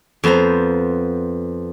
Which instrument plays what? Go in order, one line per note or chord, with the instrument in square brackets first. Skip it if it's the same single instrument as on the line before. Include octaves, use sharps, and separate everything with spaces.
[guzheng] F2 B3 C5 A#5